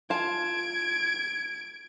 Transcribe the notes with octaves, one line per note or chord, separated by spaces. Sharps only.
F4 A5 G#6 D7